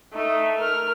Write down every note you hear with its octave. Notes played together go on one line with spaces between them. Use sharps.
A3 D#4
A#4 F6